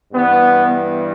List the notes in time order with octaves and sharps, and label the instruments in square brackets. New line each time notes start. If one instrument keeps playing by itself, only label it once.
[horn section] G2 E3 B3